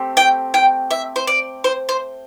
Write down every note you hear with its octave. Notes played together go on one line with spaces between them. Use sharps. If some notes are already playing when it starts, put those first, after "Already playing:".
Already playing: A3 C4 G4
G5
G5
E5
C5
D5
C5
C5